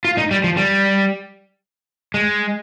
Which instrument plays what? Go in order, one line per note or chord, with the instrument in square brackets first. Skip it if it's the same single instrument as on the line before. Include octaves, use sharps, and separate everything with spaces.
[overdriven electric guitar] F4
D#4
G3
F3
G3
G#3